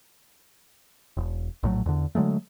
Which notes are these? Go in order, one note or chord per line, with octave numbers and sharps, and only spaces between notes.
E1
A#1 A2 F#3
E2 D3
D3 F#3 G#3 A3